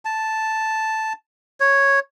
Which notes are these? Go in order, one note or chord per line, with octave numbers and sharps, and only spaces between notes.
A5
C#5